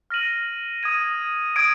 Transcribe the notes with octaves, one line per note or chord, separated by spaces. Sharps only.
F6 A#6 D#7 F#7
D#6 G#6 D#7
D#6 G#6 D7